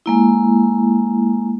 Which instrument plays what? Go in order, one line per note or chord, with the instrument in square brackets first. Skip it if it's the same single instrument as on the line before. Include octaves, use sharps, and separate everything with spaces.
[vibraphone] G#3 A#3 E4